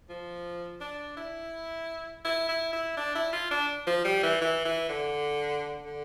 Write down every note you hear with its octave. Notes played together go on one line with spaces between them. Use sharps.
F3
D4
E4
E4
E4
E4
D4
E4
F4
D4
F3
G3
E3
E3
E3
D3
D3